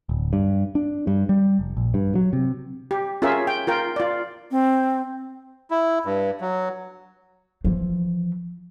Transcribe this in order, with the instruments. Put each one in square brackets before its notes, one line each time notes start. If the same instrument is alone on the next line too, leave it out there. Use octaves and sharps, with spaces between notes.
[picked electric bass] D1
G2
D4
G2
G3
F1
A#1
G2
F#3
C3
[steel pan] G4
C#4 F4 G#4 A#4 E5
G5
F4 A#4 G5
F4 D5
[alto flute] C4
[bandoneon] E4
G2
F#3
[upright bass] E3 F3